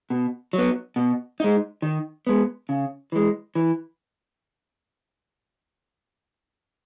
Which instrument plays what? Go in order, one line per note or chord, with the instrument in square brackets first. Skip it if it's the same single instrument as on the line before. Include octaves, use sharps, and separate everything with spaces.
[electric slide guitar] B2
F#3 B3
B2
G#3 D#4
D#3
G#3 B3
C#3
E3 G#3
E3